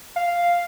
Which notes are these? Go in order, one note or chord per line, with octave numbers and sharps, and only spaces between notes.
F5